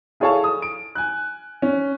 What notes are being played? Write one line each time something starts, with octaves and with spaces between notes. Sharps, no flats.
E4 G#4 A4 C#5 F5 A5
D#6
D7
G#5 F#6
C#4